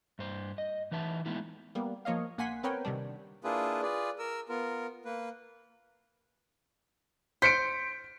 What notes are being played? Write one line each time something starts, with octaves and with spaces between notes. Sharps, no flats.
G2 C5
D#5
E3 D#4 B4 E5 A5
G#3 B3 D#4 E4
G3 A#3 B3
F3 A#3 C#5 D#5 F5
A#1 A#3 F#5 G#5 C6 B6
B3 C4 A#4 B4 C#5 G5
C3 D#3 G3 D4
A#3 D4 E4 F4 G#4 B4
F4 G#4 B4 D5
A#4 E6
B3 F4 A#4
A#3 B4
C5 B6 C#7 D7